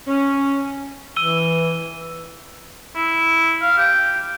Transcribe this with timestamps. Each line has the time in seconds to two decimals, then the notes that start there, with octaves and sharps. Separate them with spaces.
0.07 C#4
1.16 E3 E6 D#7 G7
2.96 E4
3.62 F5
3.77 G4